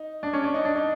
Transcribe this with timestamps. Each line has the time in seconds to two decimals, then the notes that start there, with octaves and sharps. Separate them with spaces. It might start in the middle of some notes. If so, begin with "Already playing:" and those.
Already playing: D#4
0.23 D4
0.33 C#4
0.44 D4
0.54 D#4
0.65 D4
0.75 D#4